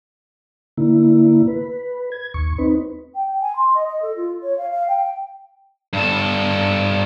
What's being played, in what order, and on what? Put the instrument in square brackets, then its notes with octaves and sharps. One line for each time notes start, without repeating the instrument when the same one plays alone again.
[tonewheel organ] D3 A#3 E4
B4
G#6
D#2 C#6
C4 D#4 B4
[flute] G5
G#5
C6
D#5
D#5
A4
F4
C#5
F5
F5
G5
[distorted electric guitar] G2 A4